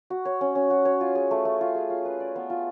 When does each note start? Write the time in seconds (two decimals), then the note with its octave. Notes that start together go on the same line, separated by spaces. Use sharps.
0.10 F#4
0.25 C#5
0.41 C#4
0.55 C#4
0.70 F#4
0.85 C#5
1.01 F4
1.15 G#4
1.31 A3
1.45 A3
1.61 F4
1.75 G#4
1.90 F4
2.05 B4
2.20 D5
2.36 B3
2.50 F4